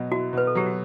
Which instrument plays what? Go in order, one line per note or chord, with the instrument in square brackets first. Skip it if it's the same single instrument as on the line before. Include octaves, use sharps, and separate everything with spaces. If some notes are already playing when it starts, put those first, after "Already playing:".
Already playing: [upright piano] B2 F#3 B3
[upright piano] E4 [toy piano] F#4
[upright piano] B2 [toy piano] B4
[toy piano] A4
[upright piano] F#3 [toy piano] G4
[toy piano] F#4